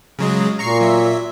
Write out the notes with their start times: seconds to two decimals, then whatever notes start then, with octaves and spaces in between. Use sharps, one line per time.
0.19 C#3 F#3 G#3
0.59 A#2 A#5 C#6 C7
0.81 F#3 E5